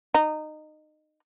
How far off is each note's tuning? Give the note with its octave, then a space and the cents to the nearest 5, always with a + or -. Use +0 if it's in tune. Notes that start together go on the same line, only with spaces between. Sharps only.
D#4 -20